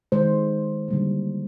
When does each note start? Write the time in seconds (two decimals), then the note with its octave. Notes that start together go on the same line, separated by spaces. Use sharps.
0.12 D#3 G#3 C5
0.88 D3 G3 A#3